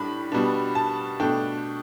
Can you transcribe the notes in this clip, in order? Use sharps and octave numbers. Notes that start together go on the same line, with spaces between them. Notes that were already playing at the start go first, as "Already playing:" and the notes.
Already playing: A2 G3 D4 B5
B2 G3 B3 D4
A5
B2 A3 D4 G5